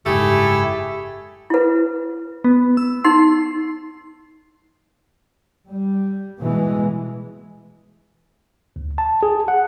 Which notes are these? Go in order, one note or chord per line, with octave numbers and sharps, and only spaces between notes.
F#1 G#2 A3 E4 G4 G#4 E5
E4 B4
B3
E6
D#4 C6 C7
G3
B2 E3 G#3
D2
A5
G#4
F#5